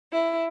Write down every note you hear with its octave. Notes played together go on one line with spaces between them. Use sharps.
E4